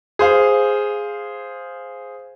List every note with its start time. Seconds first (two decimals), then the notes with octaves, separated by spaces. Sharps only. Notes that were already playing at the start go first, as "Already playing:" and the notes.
0.19 G#4 C5 F5